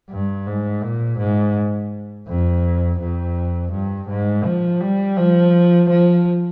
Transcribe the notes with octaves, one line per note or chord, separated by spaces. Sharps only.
G2
G#2
A#2
G#2
F2
F2
G2
G#2
F3
G3
F3
F3